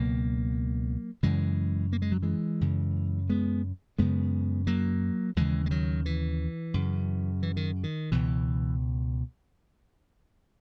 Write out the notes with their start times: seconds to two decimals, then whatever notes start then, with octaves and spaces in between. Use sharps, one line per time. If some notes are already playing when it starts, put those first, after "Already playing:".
Already playing: C#2 B2 F#3 A#3
1.23 F#2 C#3 E3 G#3
1.93 A#3
2.02 G#3
2.12 F#3
2.23 E3 G#3
2.61 F#2 C#3
3.30 G#3 B3
3.99 F#2 C#3 G#3 B3
4.67 F#3 A#3
5.36 D#2 C#3 E3 G#3
5.66 G#3
5.71 D#3 F#3
6.06 E3
6.74 F#2 C#3
7.43 E3
7.57 D#3
7.84 D#3
8.12 C#2 B2 E3